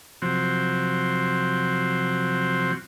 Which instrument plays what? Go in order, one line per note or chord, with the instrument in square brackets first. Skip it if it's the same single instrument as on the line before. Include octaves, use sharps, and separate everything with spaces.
[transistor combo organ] C3 F3 F#3 C4 F#4